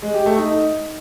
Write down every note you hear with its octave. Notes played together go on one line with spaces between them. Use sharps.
G#3
G4
A3
D#4